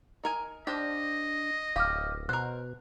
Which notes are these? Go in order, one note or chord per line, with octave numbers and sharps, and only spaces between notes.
D#4 A#4 G#5
D4 G4 C5 D#5 F5
D1 G4 F5 D6 F6
B2 A#4 C5 F#6